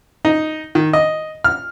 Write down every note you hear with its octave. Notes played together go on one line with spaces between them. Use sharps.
D#4
D#3
D#5
F6